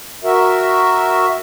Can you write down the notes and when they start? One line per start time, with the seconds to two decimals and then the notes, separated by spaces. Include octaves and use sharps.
0.24 F#4 A#4 E5